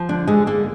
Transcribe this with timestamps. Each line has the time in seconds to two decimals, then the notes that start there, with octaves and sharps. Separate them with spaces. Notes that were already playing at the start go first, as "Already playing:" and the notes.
Already playing: F3
0.09 D3 D4
0.27 D3 G#3
0.47 D3 A#3